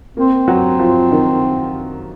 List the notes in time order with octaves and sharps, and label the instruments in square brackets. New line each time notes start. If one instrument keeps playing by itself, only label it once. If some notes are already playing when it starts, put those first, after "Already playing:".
[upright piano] A#3 [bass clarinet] C4
[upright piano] F#3
F3
D#3